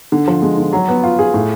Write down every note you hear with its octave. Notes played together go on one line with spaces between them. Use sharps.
D3
F3
G#3
D3
F#3
B3
F4
G#4
A2